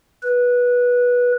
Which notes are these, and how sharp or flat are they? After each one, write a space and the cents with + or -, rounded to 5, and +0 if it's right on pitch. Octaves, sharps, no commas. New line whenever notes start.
B4 -15